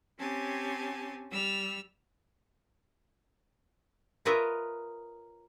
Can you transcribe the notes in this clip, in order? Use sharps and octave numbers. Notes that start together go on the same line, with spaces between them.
C4 C#4 G4 G#5 A5
G3 E6 F6
F4 A#4 B4 C#5 D#5 E5